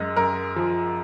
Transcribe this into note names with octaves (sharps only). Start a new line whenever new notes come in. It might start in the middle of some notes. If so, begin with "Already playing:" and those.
Already playing: F#2 G#3 D#5
F#2 A#4
F3